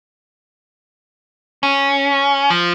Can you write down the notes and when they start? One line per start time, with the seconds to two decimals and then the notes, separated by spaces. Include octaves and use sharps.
1.63 C#4
2.50 F3